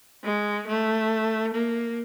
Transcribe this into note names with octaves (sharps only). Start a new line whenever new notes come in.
G#3
A3
A#3